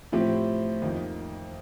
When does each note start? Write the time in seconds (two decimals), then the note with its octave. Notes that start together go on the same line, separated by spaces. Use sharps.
0.12 A2 F3 C4 G4
0.82 F2 D#3 A#3 D#4